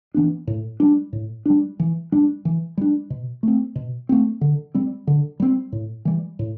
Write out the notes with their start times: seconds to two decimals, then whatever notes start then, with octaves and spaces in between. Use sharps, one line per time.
0.14 E3 B3 D4
0.47 A2
0.80 G3 D4
1.13 A2
1.46 G3 D4
1.80 E3
2.12 G3 D4
2.45 E3
2.78 G3 D4
3.10 B2
3.43 A3 C4
3.76 B2
4.09 A3 C4
4.41 D3
4.74 G3 C4
5.07 D3
5.40 G3 C4
5.72 A2
6.05 E3 G3
6.39 A2